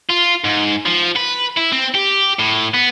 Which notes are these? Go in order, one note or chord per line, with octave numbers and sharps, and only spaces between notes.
F4
G#2
F3
B4
E4
C4
G4
A2
B3